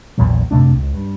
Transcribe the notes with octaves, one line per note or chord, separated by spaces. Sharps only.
A#1 E2 A#2 F#3
F#2 C3 A3 D4
C#2
G2